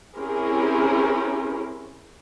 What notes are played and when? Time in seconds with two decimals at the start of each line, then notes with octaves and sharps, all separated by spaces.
0.18 C4 C#4 E4 G4 G#4 A#4